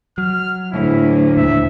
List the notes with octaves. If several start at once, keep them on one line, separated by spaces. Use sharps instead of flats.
F#3 F6
D2 A2 E4
D#2 A#2 E5